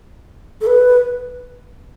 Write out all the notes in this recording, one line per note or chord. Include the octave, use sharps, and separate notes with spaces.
A4
B4